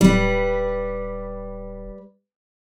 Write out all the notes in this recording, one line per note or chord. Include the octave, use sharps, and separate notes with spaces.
D1 G3 B4